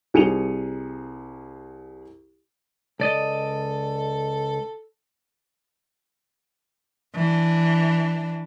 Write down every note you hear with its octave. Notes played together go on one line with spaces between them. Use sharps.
C2 G#4 C#7 D#7 F7
C#2 A4 D5 D#5
E3 D4